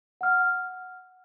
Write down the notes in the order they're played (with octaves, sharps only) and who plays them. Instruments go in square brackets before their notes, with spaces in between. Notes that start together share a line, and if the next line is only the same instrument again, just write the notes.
[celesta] F#5 F6